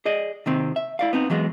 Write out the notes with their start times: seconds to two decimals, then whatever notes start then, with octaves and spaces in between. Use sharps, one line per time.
0.05 G#4 D5 D#5
0.46 C3 D#3 C4
0.76 E5
0.99 E4 D5 F5
1.13 B3 C4 D#4
1.30 E3 F#3 G#3 B3